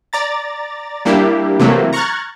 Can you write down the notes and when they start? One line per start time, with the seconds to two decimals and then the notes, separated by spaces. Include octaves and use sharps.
0.13 D5 A#5 A6
1.05 G3 A#3 D4 E4 G4
1.60 C3 E3 F#3 A3 A#3
1.93 A#5 C#6 F6 F#6 G#6 A6